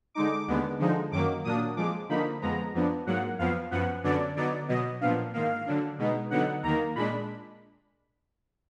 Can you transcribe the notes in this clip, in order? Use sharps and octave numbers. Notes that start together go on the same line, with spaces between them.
D3 G#3 D#4 D6
D#2 D3 G#3 B3
D3 F3 G#3 D#4
F#2 D#3 F#3 A#3 D6
A#2 F#3 A#3 D4 D#6
F2 F3 G#3 D6
D3 F3 A#3 D#4 B5
F2 F3 G#3 B3 A#5
F2 F3 B3 D4
G#2 F#3 A#3 F#5
F2 F3 B3 F5
F#2 F3 B3 F#5
F#2 D3 F#3 B3 D4 D5
D3 F#3 B3 D#4 D5
B2 F#3 B3 D#5
A#2 F3 B3 D4 F5
G#2 D#3 A#3 F5
D3 F#3 D4
B2 G#3 B3 D#4
D3 F#3 B3 D#4 F#5
D#2 D#3 A#3 A#5
A#2 G#3 D4 B5